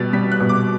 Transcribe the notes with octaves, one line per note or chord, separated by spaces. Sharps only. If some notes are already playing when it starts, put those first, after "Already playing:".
Already playing: B2 G3 A6
G3 B6
F#6
B2
D6